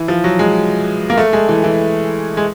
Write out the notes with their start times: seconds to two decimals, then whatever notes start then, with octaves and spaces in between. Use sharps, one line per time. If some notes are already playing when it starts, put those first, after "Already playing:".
Already playing: E3
0.08 F3
0.24 F#3
0.39 G#3
1.10 A#3
1.18 A3
1.33 G#3
1.49 E3
1.64 E3
2.37 G#3